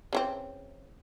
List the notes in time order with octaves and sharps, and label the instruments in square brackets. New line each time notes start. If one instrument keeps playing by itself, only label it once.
[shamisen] C#3 E3 C4